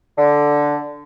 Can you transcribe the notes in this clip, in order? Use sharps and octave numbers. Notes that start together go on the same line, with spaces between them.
D3